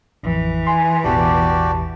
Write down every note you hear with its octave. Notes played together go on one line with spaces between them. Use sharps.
A1 F2 E3
G#5 C6
A1 E2 B2 F#4 G4 D5 A5